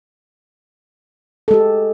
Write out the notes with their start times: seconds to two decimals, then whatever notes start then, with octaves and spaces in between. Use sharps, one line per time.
1.48 A4
1.51 G#3
1.54 G4